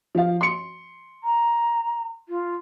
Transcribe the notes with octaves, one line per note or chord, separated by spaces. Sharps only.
F3 F5
C6 C#7
A#5
F4